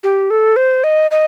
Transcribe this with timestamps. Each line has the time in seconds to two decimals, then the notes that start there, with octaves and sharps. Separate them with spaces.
0.03 G4
0.30 A4
0.56 C5
0.84 D#5
1.11 D#5